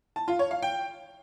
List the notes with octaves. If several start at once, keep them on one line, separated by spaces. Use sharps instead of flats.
A5
F4
C#5
F5
G5